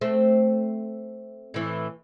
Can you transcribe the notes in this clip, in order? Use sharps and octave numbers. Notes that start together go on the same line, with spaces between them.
A3 C4
A2 E3